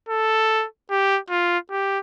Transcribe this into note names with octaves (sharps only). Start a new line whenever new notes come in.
A4
G4
F4
G4